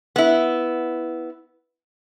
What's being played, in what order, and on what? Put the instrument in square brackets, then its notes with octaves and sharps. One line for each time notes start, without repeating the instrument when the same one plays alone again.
[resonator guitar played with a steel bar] B3 E4